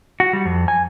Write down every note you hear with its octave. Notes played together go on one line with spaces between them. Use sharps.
F#4
G3
F2
G#5